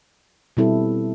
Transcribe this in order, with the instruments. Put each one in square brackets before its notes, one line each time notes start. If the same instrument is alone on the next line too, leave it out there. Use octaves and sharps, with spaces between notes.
[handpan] B2 G3 C4 E4 A4